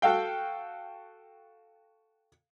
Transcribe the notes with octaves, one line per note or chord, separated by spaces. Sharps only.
F#4 A4 F5 G5